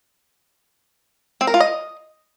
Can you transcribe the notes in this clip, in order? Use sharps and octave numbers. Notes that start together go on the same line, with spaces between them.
C4
A#4
F4
D#5